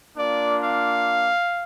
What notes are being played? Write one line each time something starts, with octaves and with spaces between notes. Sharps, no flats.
A#3 D4 F4 D5
F5